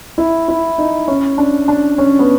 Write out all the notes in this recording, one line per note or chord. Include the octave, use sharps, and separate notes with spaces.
E4
E4
D#4
C#4
D4
D4
C#4
B3